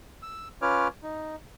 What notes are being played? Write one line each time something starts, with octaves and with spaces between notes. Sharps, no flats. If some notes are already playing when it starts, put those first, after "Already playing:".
E6
C#4 F4 B4 C#5 D6 F6
D#4